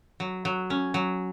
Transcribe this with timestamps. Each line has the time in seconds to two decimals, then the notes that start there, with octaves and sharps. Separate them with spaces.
0.20 F#3
0.45 F#3
0.70 C#4
0.94 F#3